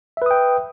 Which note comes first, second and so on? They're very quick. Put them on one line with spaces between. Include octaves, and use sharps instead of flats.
E5 B4 D#6 G5